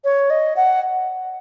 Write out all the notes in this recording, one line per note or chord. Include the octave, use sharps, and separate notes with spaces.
C#5
D#5
F#5